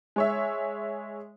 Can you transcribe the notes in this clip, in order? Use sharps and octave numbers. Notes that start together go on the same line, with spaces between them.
G#3 C#5 E5